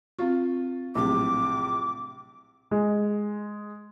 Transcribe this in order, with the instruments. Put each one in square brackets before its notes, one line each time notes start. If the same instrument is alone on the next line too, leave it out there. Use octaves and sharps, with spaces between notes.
[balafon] C4 F5 C#6 [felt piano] F4
[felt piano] A#1 A2 C3 [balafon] F#3 C4 G4 [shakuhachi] D6
[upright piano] G#3